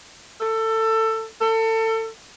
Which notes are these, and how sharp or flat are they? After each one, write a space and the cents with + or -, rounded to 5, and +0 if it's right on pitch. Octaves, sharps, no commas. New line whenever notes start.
A4 +20
A4 +30